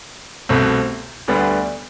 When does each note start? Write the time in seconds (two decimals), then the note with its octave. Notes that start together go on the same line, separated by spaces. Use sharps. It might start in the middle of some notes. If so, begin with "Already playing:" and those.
0.49 C2 B2 A3 C4
1.28 D2 D3 G3 B3 D4